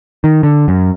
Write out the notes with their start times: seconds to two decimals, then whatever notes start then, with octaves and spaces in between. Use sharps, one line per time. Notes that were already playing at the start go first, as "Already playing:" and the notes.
0.24 D#3
0.43 D3
0.68 F#2